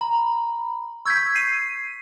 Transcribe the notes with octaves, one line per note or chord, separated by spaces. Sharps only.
A#5 B5
C#6 E6 G6 G#6 B6
C7 D#7